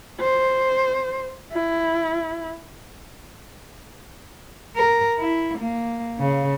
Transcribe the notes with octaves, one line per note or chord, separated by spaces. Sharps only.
C5
E4
A#4
E4
A#3
C#3